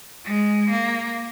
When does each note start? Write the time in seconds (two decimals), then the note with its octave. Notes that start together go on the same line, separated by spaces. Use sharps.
0.25 G#3
0.70 A#3